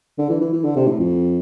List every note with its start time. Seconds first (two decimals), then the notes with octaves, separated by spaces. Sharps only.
0.18 D3
0.29 E3
0.41 E3
0.53 E3
0.64 D3
0.76 C3
0.87 A2
0.99 F2